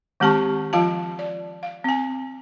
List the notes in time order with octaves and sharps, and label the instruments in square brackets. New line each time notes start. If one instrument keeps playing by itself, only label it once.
[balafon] D#3 G#3 C4 G4 A5 C#6
F3 F4 F5 A5
D5
F5
C4 G#5